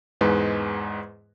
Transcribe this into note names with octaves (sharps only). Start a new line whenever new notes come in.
E2 G#2 G#3 B4